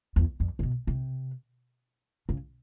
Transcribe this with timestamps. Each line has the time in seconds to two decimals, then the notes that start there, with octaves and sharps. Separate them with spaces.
0.16 E2
0.40 F2
0.59 A#2
0.63 B2
0.87 C3
2.29 C#3